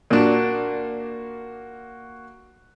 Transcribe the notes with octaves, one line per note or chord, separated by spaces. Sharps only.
A#2 A#3 D4 F#4